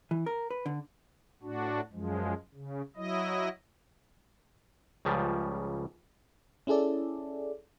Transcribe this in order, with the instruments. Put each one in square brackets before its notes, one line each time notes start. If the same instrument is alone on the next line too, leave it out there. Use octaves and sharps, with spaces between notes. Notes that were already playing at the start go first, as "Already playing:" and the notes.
[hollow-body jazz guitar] E3
A#4
B4
D3
[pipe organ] A2 D4 F#4
F#2 F3 G#3
C#3
F#3 E4 D#5
[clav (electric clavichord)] C#2 C#3 F3 G3
[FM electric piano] C#4 E4 G#4 A4 D5